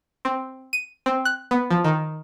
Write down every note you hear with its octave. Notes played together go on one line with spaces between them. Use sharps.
C4
D#7
C4
F#6
B3
F3
D#3